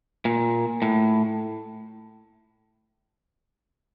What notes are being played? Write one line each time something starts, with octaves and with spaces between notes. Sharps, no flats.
A#2
A2